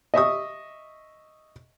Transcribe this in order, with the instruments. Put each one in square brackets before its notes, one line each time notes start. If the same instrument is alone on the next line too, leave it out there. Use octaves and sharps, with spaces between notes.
[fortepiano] D#5 E5 C#6 D#6